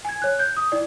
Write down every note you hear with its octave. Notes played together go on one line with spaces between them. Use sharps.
G#5 G#6
C#5 F#6
G6
D#6
E4 D5